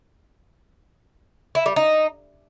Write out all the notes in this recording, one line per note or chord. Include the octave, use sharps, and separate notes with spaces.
E4
G3
D#4